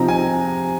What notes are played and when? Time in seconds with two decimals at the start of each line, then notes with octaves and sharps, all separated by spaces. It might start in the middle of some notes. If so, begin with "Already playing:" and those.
Already playing: C3 F3 C4 D#4 A#5
0.08 G#5